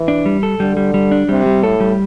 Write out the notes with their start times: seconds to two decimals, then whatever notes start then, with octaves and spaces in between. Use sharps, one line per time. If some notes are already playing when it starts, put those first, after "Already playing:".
Already playing: E3
0.08 D4
0.26 G3
0.43 A4
0.60 D3 G3
0.77 G3
0.94 G3
1.11 D4
1.29 C3 G3
1.46 G3
1.63 A2 A4
1.80 G3